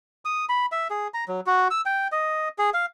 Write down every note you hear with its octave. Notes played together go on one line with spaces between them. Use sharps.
D#6
B5
E5
G#4
A#5
F#3
F#4
E6
G5
D#5
G#4
F5